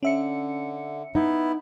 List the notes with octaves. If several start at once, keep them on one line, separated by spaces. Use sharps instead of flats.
D3 C#4 E5 C#7
B3 D#4 E4